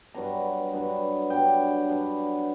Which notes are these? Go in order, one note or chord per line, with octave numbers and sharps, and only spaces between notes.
G2 F#3 B3 D4 A#5
G2 F#3 B3 D4
G2 F#3 B3 D4 G5
G2 F#3 B3 D4